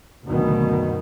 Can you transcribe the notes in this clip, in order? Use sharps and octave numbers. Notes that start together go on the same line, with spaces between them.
F#1 D2 B2 D#3